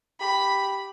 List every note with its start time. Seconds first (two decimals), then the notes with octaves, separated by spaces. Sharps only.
0.20 G4 B5